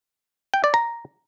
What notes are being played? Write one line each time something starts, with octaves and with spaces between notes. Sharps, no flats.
G5
D5
A#5